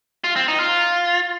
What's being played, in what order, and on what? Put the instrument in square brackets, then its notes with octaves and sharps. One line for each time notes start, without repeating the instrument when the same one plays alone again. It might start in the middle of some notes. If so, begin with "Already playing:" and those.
[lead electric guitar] F4
C4
D#4
F4